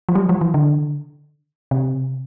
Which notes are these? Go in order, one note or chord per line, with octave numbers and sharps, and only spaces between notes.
F3
G3
F3
E3
D3
C3